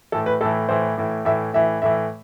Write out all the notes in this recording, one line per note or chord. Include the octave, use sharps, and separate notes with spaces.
A2 E3 A4
B4
A2 E3 A4
A2 E3 C5
A2 E3
A2 E3 E5
A2 E3 E5
A2 E3 E5